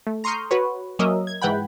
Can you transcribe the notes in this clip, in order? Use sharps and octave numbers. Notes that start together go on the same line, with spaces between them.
A3
A#5 C6 C#6 D#6 F6 G6
F#4 B4 C#5
F#3 A#3 C#4 A#4 D#5 E5
G#6
G#2 E3 F#5 G5 B5